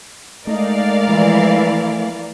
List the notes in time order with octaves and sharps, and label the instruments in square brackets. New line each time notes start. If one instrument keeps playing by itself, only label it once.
[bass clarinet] G#3 [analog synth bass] A3 [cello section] D#4 [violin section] A#4 D5 F5
[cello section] E3 F3 E4